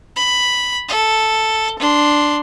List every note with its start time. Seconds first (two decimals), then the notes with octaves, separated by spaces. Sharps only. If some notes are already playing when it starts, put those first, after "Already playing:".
0.16 B5
0.89 A4
1.79 D4 C6